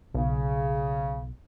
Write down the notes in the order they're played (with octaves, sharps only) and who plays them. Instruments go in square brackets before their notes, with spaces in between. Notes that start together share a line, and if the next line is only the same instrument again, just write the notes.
[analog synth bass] B1 [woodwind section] C#3